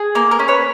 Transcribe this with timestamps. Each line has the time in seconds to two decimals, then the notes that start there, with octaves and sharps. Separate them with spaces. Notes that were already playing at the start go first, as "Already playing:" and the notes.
Already playing: G#4
0.15 A#3 A#4
0.31 A#4
0.39 C#4
0.48 B4 C#5